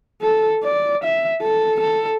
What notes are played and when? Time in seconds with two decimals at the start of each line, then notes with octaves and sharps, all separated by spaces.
0.22 A4
0.64 D5
1.04 E5
1.42 A4
1.80 A4